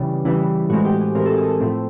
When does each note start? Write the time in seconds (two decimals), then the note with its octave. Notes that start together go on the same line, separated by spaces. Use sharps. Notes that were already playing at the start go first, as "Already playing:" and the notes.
Already playing: C#3 E3 G3
0.25 C#3 E3 G3 E4
0.70 A2 E3 G#3 C4 F#4
0.85 G4
1.00 G#4
1.15 A2 E3 G#3 C4 A#4
1.26 A4
1.37 G#4
1.48 A4
1.60 A2 F3 A3 C4